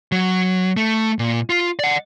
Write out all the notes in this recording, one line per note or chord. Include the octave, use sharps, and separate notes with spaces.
F#3
A3
A#2
F4
D5 F#5